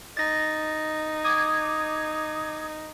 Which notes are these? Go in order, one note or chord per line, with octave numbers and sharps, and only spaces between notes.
D#4 A6 A#6
D6 D#6 G#6